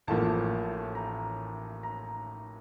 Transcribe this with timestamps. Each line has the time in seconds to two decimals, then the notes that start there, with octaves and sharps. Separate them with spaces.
0.07 A1 A2 F3 A#3 A5
0.95 A#5
1.83 A#5